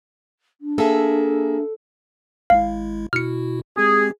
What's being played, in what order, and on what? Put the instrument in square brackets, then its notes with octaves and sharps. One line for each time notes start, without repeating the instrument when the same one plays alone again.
[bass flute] D4
[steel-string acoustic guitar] A#3 G#4 E5 [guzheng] A4
[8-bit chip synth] G#1 G#3 E4 [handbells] F5
[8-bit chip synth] B2 E4 F#4 [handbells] F6 C#7
[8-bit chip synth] G#3 C4 G4 [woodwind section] G#4